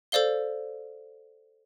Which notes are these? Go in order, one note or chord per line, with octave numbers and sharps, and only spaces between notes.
A4 C5 D5 F5 G7